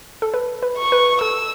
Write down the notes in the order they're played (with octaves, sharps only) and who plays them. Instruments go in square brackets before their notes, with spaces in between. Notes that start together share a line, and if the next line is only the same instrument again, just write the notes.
[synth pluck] A4
B4
B4
[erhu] C#6
[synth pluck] B4
[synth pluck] A4 [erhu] E6